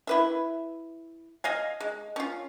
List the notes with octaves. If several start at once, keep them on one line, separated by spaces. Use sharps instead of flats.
E4 B4 E5
D#5 F5 G#5
G#3
C#4 F4